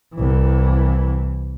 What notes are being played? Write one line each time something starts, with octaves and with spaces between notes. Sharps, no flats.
C2 E3